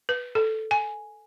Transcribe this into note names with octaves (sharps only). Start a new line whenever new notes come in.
B4
A4
G#5